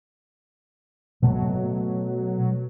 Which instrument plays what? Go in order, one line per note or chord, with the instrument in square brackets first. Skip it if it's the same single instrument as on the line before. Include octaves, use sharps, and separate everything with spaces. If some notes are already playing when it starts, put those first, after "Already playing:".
[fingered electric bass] B2 A3 [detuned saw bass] F#3